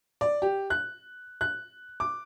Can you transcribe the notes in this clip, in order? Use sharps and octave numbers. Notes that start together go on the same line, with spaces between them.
D5
G4
F#6
F#6
D6